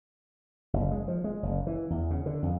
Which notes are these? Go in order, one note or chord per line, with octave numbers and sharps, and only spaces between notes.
F#1
G#3
F3
G#3
F#1
E3
E2
C#3
D3
F2